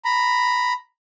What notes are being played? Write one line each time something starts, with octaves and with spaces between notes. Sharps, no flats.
A#5 B5